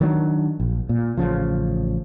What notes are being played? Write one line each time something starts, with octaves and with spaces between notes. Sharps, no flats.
D#3 F#3 C4 D4
A#1
A#2
A1 C#3 F3